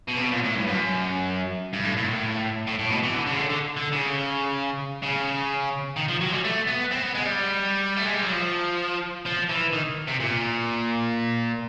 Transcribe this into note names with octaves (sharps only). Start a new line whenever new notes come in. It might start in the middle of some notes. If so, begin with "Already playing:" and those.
B2
C3
B2
A#2
A2
G2
F#2
G2
A2
A#2
A2
A2
A2
B2
E3
D3
C#3
D3
D3
D3
C#3
C#3
D#3
F3
F#3
G3
A3
B3
C4
B3
G#3
G3
A3
G#3
G3
F#3
F3
F3
E3
D#3
C3
A#2